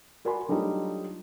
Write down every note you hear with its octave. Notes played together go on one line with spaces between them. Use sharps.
F#4 A#4 D5 G#5 B5 C6
F#3 G3 A3 D4 D#4 F4